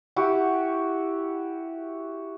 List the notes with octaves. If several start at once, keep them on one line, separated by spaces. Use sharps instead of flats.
E4 F#4 G4